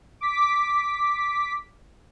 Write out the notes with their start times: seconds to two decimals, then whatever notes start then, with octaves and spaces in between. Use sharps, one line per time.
0.21 D6 B6